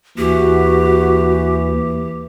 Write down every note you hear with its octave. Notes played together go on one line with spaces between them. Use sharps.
D#2 E3 F#4 G4